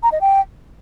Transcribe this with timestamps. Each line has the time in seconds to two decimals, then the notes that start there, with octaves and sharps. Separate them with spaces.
0.03 A#5
0.12 D#5
0.21 G5